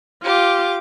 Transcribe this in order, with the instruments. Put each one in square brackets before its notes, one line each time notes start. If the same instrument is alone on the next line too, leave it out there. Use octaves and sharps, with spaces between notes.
[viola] F4 [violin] G4 D6